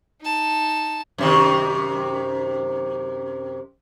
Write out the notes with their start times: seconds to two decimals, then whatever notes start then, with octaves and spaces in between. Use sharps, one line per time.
0.22 D#4 A5
1.18 F#2 C3 D#3